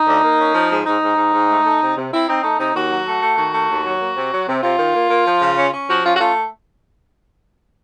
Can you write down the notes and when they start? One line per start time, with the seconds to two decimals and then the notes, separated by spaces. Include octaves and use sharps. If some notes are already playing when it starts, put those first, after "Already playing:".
Already playing: D#4
0.08 D2
0.23 A#3
0.39 C#4
0.55 F3
0.71 G#2
0.86 G#2 D#4
1.02 G#2
1.17 G#2
1.34 G#2
1.49 A3
1.66 A3
1.81 C3
1.97 C3
2.12 C4 E4
2.28 C4 D#4
2.43 A3 D#4
2.59 C3 D#4
2.74 D#2 F#4
2.90 F#3
3.06 A3
3.22 A3
3.37 D#3 F#4
3.53 A3
3.68 D#2
3.85 F#3
4.00 A#3
4.16 C3
4.32 F#3
4.47 C3
4.62 C3 F4
4.79 D#3
4.95 A#3
5.10 A#3
5.26 F3
5.42 C#3
5.57 C#4
5.73 C#4
5.89 F3 F#4
6.04 C#4 F4
6.14 F#4
6.20 A3 F4